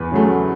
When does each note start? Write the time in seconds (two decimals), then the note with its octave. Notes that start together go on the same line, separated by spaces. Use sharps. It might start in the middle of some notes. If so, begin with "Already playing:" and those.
Already playing: E2 B4
0.12 C#3 F#3 A3